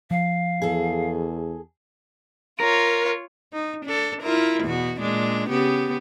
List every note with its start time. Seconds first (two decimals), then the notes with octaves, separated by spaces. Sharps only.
0.11 F3 F5
0.62 E2 G#4 A4
2.60 F4 A#4 C#5
3.53 D#4
3.86 D4 A4
4.22 E4 F4 A#4
4.64 E2 B2 F#4
5.01 A#2 G#3 D4
5.50 C#3 B3 G4